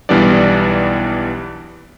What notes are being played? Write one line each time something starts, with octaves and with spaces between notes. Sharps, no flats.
B1 E3 G3 B3 D4 D5